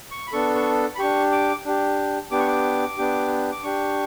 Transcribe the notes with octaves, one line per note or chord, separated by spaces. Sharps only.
C#6
B5
B3 D4 A4 C#6
C#6
B5
D4 G4 C#6
D6
D4 G4
B3 D4 G4 D6
C#6
D6
B3 D4 G4
D6
D4 G4 C#6